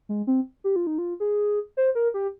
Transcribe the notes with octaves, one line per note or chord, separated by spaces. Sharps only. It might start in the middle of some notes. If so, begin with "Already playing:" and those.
G#3
C4
G4
F4
D#4
F4
G#4
C5
A#4
G4